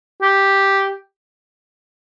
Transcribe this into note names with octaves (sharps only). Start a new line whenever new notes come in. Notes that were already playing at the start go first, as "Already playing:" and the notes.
G4